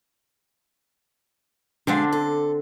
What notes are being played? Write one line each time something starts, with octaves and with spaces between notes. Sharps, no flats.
B2 D3 G#3 C4 D4 F5
A4